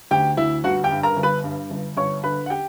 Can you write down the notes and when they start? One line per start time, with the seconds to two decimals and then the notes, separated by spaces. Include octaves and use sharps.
0.11 D2 G4 G5
0.37 D2 E4 E5
0.64 G1 F#4 F#5
0.84 G4 G5
0.91 G2
1.03 A#4 A#5
1.17 G1
1.23 B4 B5
1.44 G2
1.70 G1
1.97 G1 C#5 C#6
2.24 D3 B4 B5
2.46 F#5
2.50 G4 G5